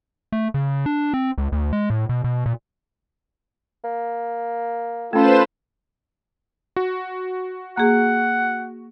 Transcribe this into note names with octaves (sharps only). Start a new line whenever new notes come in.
A3
C#3
D4
C4
C#2
D2
G#3
A2
B2
B2
A#2
A#3
A3 C#4 F4 A4 B4 C5 E7
F#4
A#3 G#4 F#5